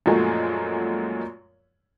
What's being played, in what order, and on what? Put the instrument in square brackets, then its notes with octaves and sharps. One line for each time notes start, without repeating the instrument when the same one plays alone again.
[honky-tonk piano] F#2 A#2 F3 F#3 G#3 A3